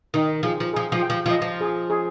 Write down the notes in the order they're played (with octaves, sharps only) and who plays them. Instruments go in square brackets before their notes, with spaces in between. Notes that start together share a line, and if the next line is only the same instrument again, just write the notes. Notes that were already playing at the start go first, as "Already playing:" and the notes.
[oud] D#3 [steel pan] D#4
[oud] F3 [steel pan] G#4
[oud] F3
[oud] F3 [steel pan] G#4
[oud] F3
[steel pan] G5
[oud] F3
F3
[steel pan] D#5
[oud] F3
[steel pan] G#4
G#4